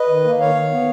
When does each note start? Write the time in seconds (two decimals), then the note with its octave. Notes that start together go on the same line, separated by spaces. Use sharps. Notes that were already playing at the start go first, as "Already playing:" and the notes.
Already playing: B4 D#5
0.09 D#3
0.24 A#3
0.40 D#3 C#5 F5
0.55 D#3
0.71 B3